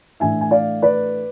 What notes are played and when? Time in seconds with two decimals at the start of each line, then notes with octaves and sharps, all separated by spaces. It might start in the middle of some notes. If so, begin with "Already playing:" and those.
0.20 A2 E3 A3 D4 E5 G#5
0.41 G#5
0.51 D5 F5
0.82 B4 D5